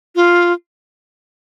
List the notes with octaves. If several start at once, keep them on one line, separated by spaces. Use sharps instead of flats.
F4